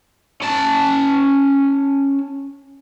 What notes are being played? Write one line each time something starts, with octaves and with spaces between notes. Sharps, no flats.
C#4 A5